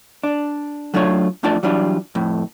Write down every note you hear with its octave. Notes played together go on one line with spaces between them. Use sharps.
D4
F#3 A3 D4 F4 C#5
F2 A3 D4 F4 D5 A5
E3 F#3 G3 D4 F4
F2 A2